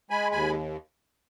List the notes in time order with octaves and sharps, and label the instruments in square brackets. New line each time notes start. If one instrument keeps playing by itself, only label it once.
[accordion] G#3 G#5 B5
D#2 G#5 B5